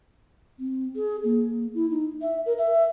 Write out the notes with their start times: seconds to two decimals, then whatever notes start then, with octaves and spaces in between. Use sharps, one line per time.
0.59 C4
0.96 G#4
1.24 A#3
1.74 E4
1.90 D#4
2.22 E5
2.46 A#4
2.58 E5